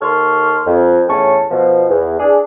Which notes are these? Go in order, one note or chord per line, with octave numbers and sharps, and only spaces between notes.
D#2 A4 C6 C#6 F6
F2
E2 A2 C#4 A5 C#6
B2 F3
E2
D4 G#4